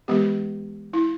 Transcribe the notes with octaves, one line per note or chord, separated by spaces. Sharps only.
E3 G#3 B3 G4
E4